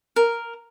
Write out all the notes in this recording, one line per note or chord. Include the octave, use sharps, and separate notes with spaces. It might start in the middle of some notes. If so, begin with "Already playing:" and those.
A#4